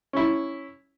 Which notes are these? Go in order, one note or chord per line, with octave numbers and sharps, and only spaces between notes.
C#4 E4